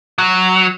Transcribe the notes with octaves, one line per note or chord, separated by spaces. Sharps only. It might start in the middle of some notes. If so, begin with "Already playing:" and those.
F#3